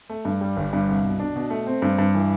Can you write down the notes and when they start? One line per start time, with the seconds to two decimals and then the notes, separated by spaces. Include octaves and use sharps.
0.09 A3
0.25 G2
0.41 G3
0.57 G1
0.73 G2
0.89 C2
1.04 B2
1.20 D4
1.36 B2
1.50 A3
1.66 C4
1.82 G2
1.99 G2
2.14 E3